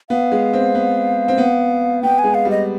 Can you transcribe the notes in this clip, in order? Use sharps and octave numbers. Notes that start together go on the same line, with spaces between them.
B3 F5
G#3
C4
B3
C4
B3
B3 G5
G#3 G#5
F5
G3
D#5